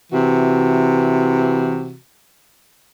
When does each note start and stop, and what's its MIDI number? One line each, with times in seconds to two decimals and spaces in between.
0.12 1.95 48
0.12 1.95 52
0.12 1.95 66